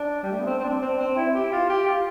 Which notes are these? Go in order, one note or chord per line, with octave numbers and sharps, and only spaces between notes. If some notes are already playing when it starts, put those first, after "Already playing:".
Already playing: D4
G3
A3
B3
C4
C4
D4
C4
C4
E4
G4
F4
G4
F4